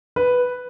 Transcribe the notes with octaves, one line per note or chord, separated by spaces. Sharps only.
B4